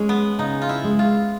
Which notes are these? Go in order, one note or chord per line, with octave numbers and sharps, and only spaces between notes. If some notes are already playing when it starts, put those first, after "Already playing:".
Already playing: G#3 C#4
B3
C#3 D#4
F4
E4
G#3
F4